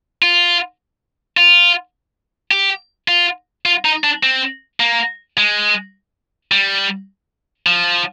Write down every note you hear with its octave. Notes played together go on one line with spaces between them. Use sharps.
F4
F4
G4
F4
F4
D#4
D4
C4
A#3
G#3
G3
F3